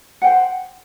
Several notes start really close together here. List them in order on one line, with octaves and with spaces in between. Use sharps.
F#5 G5 C5